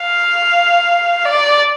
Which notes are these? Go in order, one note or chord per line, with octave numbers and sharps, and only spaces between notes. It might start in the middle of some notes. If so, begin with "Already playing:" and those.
Already playing: F5
D5